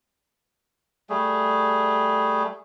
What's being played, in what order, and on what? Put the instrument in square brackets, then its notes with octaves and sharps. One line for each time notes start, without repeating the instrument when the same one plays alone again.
[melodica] G3 A3 G#4